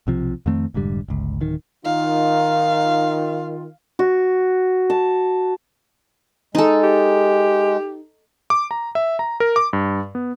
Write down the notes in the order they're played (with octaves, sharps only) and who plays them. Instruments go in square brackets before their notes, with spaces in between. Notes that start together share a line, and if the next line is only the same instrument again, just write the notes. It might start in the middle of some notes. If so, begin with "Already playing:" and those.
[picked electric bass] B1 C3 F3
F2 D#3 A3 C4
F1 G#2 D3 G3
G1 C#2
D1 D#3
[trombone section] D#3 F4 [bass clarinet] D#4 [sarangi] F5
[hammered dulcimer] F#4
A5
[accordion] G#3 [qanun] D#4 A4
[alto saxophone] G4
[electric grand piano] D6
A#5
E5
A#5
A#4
D6
G2
B3